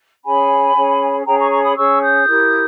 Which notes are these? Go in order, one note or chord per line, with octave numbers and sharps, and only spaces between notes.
C#4 G#4 C#5 G#5 B5
C#4 G#4 C#5
C#4 G#4 C#5 G5 A#5
A#5 C#6
A#5 C#6
B5 D#6
C#4 G#4 C#5 C#6 E6
D#6 G6
E4 G4 A#4